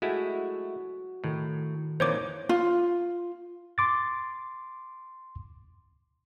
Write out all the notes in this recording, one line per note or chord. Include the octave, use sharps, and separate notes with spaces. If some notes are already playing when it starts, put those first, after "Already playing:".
G#3 A3 E4 F#4 E5 D7
A2 D#3
F2 A#2 D#3 E3 C5 C#5 D6
F4
C6 D6 A6